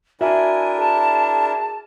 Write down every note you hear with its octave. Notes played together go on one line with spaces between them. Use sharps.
D4 E4 F#4 A#4 E5 G#5
G#4 A5